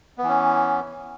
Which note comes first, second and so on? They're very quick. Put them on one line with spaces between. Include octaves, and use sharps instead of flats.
B3 E3 C#4